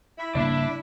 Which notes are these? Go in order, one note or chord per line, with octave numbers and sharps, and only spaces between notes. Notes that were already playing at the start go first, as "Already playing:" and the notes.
E4
C#3 G3 A#3 D4 E4 D5